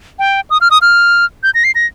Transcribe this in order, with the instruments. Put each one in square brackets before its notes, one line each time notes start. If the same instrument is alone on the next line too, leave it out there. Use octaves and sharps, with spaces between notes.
[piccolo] G5
D#6
F6
D#6
F6
G6
A#6
C7
A#6